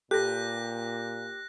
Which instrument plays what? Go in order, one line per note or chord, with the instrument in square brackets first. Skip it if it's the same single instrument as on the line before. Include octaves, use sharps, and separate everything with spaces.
[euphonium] A#2 [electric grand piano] G4 [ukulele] A4 B4 [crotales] F#6 A#6